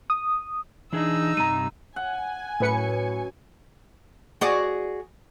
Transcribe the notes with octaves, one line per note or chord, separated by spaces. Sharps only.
D#6
E3 D4 D#4 G#4 E6
G2 C3 G3 A#5 D#7
F#5 G#5
F#2 A2 B4 C#7
F#4 G#4 D5